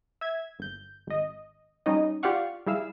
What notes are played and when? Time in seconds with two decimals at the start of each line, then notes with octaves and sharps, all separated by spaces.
0.21 E5 G#6
0.59 G1 G6
1.07 G#1 D#5
1.86 G3 C#4 D#4 D#5
2.23 F4 G4 D5 F5 F#5 C#6
2.67 G3 E4 G#4 F5 E6